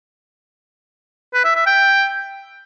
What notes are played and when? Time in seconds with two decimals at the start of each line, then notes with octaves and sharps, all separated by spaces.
1.34 B4
1.45 E5
1.56 E5
1.66 G5